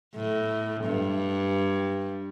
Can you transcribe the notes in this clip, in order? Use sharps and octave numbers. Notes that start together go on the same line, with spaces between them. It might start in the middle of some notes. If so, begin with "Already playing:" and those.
A2
G2